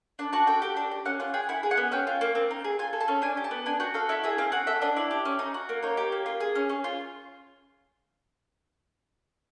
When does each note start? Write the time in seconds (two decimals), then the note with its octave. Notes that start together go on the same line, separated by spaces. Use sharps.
0.19 D4 A5
0.33 F#4 A5
0.47 A4 G5
0.62 G4
0.76 D4
0.91 G4
1.05 C#4 F#5
1.20 F4 F#5
1.34 G#4 G5
1.49 E4 F#5
1.63 G#4
1.71 F#5
1.77 B3
1.92 C#4 G5
2.07 F4
2.21 A#3
2.35 C4
2.51 D#4
2.64 G#4
2.79 F4 G#5
2.93 A4
3.00 A5
3.08 C#4
3.22 D4 G#5
3.37 G4
3.44 A5
3.51 B3
3.66 D4 G#5
3.80 F#4 G5
3.94 A4 F5
4.09 E4 E5
4.24 G#4 E5
4.38 C4 F5
4.52 F#4 F#5
4.67 A4 E5
4.82 D4 D#5
4.97 E4 D5
5.11 G4
5.25 C#4
5.39 D#4
5.54 F#4
5.69 A#3
5.83 D#4 C#5
5.97 G4
6.12 A#3
6.26 F4
6.41 G#4
6.55 C#4
6.69 C#4
6.84 F4